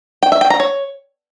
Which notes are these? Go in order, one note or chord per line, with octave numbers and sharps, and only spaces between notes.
G5
E5
G5
A#5
C#5